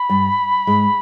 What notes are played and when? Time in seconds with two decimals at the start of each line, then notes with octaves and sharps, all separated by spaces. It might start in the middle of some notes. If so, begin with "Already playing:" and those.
Already playing: B5
0.09 G2 G3
0.67 G#2 G#3